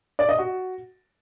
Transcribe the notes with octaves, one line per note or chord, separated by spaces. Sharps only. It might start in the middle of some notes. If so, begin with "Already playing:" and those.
D5
D#5
F#4